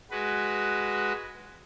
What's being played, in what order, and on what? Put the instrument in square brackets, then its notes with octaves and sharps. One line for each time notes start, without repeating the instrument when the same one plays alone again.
[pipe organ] G#3 F#4 B4